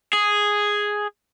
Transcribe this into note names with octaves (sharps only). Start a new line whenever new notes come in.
G#4